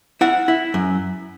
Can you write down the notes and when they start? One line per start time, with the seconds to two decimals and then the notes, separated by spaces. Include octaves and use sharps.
0.21 E4 F#5
0.48 E4
0.74 F#2